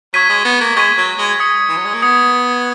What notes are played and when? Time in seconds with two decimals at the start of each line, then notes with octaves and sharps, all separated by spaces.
0.14 F#3 C#6 G#6 B6 D#7
0.29 G#3
0.45 B3
0.61 A#3
0.76 G#3 C#6 G#6 B6 D#7
0.98 F#3
1.19 G#3
1.40 D#6 G#6 C#7
1.69 E3
1.77 F#3
1.85 G#3
1.94 A#3
2.02 B3 D#6 G#6 C#7